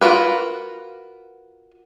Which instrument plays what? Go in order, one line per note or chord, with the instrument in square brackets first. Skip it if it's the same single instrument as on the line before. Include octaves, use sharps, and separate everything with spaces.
[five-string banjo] F4 F#4 A#4 B4